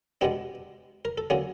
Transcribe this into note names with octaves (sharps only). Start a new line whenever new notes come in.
B2 G#3 B3 D4 G4
A#4
A4
D3 F#3 A#3 C#4 G#4